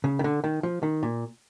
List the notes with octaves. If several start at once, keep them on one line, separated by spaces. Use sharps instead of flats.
C#3
D#3
D3
D#3
F3
D#3
A#2